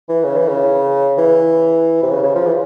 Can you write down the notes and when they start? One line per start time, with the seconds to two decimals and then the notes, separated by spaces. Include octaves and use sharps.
0.09 E3
0.25 C#3
0.37 E3
0.49 C#3
1.18 E3
2.03 C3
2.11 C#3
2.23 C#3
2.35 F3
2.47 E3